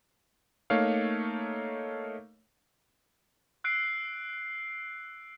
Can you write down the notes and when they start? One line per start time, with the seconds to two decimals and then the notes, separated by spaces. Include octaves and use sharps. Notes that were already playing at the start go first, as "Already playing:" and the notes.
0.70 A3 A#3 D#4 C#5 F5
3.64 E6 F#6 C7 D7